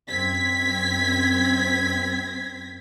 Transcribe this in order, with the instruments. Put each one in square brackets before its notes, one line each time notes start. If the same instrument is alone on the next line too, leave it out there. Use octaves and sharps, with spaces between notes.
[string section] F#2 C4 G#6 B6